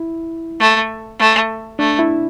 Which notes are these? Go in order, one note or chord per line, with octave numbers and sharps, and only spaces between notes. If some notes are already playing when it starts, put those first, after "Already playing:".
Already playing: E4
A3
A3
A3 D4
E4